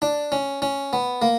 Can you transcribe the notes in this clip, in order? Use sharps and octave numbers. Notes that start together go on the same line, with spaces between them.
D4
C#4
C#4
B3
A#3